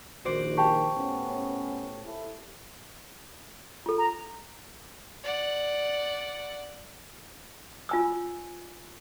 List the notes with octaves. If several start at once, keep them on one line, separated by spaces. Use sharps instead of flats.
A#1 D#3 F#4 C5 D5
G4 G5 A5 C#6
A2 B3 C#4
E4 A4
F4 A4
A#5
D5 F#5
F4 G#5 E6